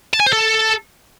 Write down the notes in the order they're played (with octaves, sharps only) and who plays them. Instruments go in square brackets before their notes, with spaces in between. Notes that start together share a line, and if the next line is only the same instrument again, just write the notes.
[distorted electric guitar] A5
G#5
C5
A4